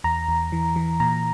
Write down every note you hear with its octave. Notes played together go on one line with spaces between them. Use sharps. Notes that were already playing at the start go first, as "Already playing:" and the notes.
E2 A#5
E2
E3
E3
A#2 A#5